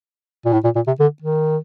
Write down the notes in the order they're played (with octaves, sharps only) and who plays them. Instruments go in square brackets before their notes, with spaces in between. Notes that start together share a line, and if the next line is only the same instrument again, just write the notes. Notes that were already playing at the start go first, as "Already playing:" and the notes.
[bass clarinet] A#2
A2
A#2
A#2
C3
D3
D#3